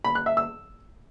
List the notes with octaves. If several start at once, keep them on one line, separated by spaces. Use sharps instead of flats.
B5
F#6
E5
E6